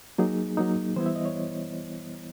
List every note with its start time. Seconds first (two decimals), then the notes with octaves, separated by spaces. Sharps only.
0.18 F#3 A#3 D#4 G#4
0.57 F#3 A#3 D#4
0.96 E3 G3 B3 E4 C5
1.06 E5
1.16 D#5
1.25 C#5